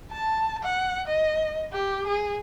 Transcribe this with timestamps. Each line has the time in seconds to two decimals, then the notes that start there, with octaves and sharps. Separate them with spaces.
0.12 A5
0.63 F#5
1.07 D#5
1.73 G4
2.07 G#4